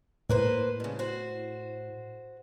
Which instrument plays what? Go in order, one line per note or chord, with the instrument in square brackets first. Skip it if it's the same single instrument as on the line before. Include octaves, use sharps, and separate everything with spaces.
[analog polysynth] A2 [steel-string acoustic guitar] A#3 B4 C5
[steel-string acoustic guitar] G2 C#3
F#4 C5